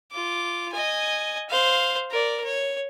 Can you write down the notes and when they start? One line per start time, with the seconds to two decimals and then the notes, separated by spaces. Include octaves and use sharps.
0.12 F4 D6
0.72 D#5 G#5
1.49 C5 F5
2.11 A#4 D5
2.44 C#5